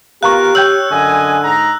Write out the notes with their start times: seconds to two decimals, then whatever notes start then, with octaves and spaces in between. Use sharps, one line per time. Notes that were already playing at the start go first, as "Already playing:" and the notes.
0.23 B3 F4 G4 A#4 F5 A#5 C#6 F#6
0.55 C#5 G5 E6 G6 F#7
0.91 F#2 D3 D#5 G#5
1.44 G#2 D#4 A#5